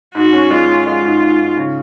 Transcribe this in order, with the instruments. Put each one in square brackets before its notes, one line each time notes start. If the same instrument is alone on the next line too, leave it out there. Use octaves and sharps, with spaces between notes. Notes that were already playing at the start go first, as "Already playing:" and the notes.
[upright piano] G#2 [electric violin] F#4
[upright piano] C#4
[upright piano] G#3 [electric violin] F4
[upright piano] C#4
[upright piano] G#3 [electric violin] F4
[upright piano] G#2
G#2
G#2
C#3